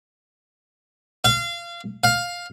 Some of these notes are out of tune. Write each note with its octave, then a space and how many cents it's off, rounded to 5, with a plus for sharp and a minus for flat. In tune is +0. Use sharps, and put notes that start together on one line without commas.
F5 -25
F5 +10